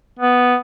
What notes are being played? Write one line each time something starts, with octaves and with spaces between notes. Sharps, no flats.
B3